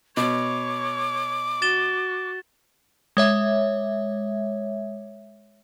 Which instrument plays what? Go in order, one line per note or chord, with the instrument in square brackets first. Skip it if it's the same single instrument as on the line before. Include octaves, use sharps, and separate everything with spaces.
[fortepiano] B2 [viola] C#5 [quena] D6
[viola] F#4 [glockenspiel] A6 E7 G7
[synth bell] G#3 C#5 E5